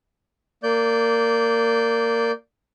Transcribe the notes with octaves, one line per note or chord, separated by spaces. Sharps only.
A#3 D5 G6